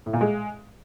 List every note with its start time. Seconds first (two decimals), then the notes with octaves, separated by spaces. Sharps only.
0.06 A2
0.13 A#2
0.21 G#3